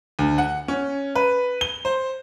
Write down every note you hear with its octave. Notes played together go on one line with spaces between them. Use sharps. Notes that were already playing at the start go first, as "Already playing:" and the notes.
D2
F#5
C#4
B4
G7
C5